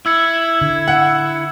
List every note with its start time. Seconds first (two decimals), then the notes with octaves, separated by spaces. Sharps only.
0.06 E4 E6 G#6 C#7
0.61 D3
0.88 F#5